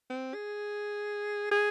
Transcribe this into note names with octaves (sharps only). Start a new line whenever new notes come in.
C4
G#4
G#4